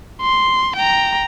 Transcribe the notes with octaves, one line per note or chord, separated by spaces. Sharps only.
C6
G5 A#5